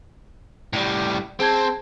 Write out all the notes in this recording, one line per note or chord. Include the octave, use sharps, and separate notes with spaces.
A2 G3
C4 G#4 A5 G#6